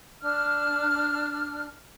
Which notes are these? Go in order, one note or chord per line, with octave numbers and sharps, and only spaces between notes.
D4 F6